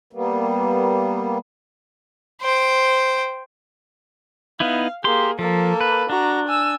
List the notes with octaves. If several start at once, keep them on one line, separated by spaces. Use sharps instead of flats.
G3 A#3 B3
C5 G5
B3 D#4 E4 F5
A#3 G4 G#4 C6
F3 A#3 A4
B4
D4 F#4 A#5
G#5 E6